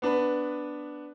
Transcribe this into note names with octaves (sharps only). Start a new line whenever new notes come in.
B3 D4 B4 B5